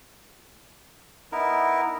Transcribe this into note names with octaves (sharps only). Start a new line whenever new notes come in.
B3 D#4 E4 A#4